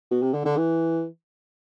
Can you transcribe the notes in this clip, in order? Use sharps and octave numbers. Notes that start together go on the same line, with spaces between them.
B2
C3
D3
D3
E3